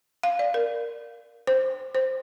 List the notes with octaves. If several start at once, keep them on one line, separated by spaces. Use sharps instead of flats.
F5
D5
A#4
C5
C5